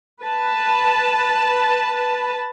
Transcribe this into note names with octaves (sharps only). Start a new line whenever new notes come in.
B4 A5